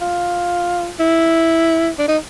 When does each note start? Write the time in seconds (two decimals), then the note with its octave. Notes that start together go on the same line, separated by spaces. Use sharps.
0.01 F4
1.00 E4
1.99 D4
2.08 D#4